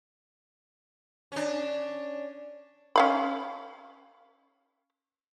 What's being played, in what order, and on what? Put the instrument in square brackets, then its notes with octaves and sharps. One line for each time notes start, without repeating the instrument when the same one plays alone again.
[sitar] C#4 D4
[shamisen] C#4 F5 B5